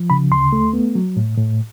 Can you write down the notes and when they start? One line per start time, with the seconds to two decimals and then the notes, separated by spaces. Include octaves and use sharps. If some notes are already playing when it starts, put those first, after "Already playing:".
Already playing: F3
0.10 C#3 B5
0.32 D2 C6
0.53 A3
0.73 B3
0.95 F#3
1.17 A2
1.38 A2